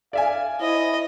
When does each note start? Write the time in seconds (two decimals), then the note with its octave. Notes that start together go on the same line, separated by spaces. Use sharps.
0.13 D5 E5 F5 G#5
0.61 E4 C5 D#5